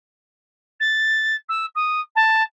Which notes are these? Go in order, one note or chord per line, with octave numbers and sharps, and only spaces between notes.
A6
E6
D#6
A5